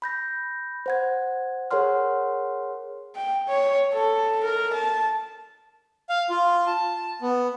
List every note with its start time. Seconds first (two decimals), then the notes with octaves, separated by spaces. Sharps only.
0.02 B5 G6 A#6
0.86 C5 F#5 G#6
1.71 G#4 A#4 C#5 F#5 C6 F6
3.16 G5
3.48 C#5
3.93 A4
4.44 A#4
4.74 A5
6.09 F5
6.30 F4
6.67 A5
7.21 B3